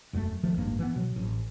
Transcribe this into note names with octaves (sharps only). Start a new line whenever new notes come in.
E1 F#2 C#3 A3
A#1 D#3 F3 A3
D1 G#1 G2 A#3
E3 B3
B2 F#3
A1